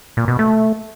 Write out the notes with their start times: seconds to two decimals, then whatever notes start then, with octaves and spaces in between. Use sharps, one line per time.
0.17 A#2
0.28 B2
0.39 A3